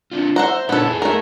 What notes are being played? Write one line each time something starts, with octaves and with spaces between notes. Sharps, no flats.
C4 D4 F4
C5 E5 F#5 A#5
A#2 B3 D4 A4 C#5
E4 G#4
A3 A#4